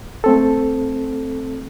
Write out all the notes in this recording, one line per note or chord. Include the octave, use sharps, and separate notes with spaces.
A3 C4 A4